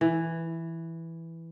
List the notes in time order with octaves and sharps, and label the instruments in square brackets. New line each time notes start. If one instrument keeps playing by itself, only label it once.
[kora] E3